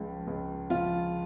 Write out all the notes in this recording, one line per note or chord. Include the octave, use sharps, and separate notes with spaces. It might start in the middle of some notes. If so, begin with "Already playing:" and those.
Already playing: C#2 C#3 F3
C#2
F3 F4